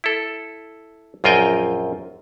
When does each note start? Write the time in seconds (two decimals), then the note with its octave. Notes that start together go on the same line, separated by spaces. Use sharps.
0.04 E4 A4
1.24 A#1 F#2 F4 D#5 G5 G#5